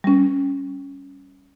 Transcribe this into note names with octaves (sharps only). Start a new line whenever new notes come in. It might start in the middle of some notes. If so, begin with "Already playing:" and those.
G3 C#4